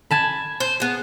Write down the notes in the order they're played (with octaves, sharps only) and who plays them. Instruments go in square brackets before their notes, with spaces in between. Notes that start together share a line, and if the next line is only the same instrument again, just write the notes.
[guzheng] G#5 A5 B5
[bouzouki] C5
B3 G#4